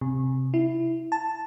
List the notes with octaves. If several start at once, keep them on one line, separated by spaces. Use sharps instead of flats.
C3
E4
A5